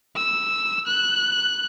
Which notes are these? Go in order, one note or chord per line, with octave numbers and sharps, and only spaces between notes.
E6
F#6